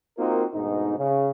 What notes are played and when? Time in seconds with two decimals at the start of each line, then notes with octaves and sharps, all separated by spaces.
0.18 A#3 C4 D#4 F4 F#4 A#4
0.54 D2 G#2 B2 D#4
0.98 C#3